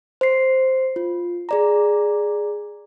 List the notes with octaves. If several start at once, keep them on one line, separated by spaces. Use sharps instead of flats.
C5 C7
F4
G#4 D5 A#5